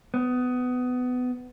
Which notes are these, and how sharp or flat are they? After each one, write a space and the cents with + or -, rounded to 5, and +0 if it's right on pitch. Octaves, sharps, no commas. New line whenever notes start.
B3 +20